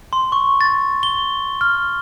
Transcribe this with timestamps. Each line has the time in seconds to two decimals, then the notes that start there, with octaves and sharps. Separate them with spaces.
0.13 C6
0.32 C#6
0.61 A6
1.03 G7
1.61 F6